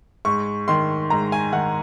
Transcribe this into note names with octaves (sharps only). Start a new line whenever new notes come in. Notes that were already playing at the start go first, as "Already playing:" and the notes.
G#2 C#6
D#3 C6
G#2 A#5
G#5
D#3 F#5